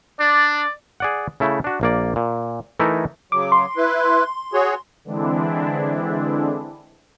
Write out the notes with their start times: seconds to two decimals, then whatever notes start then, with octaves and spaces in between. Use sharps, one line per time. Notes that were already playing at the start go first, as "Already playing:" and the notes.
0.20 D4 D5
1.00 G#4 D5 F#5
1.40 C#3 A3 E4
1.64 D4 F#4
1.81 A#1 A#3 D5
2.16 A#2
2.80 E3 A3 D#4 E4 A#4
3.32 C#3 F#3 D6
3.52 C6
3.77 E4 B4
4.53 F#4 G#4 C#5
5.05 D3 E3 G#3 C4 D4 E4